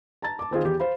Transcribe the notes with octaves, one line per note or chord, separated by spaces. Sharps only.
A5 A#5 A6
A5 D6
D#3 C4 F4 G#4
E2 G4
C5 F5 B5